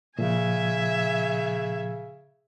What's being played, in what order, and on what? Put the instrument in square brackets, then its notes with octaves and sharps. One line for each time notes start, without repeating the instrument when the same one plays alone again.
[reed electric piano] A#2 F3 [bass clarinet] C#3 [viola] E5 G#5